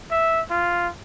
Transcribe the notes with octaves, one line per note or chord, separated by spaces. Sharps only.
E5
F4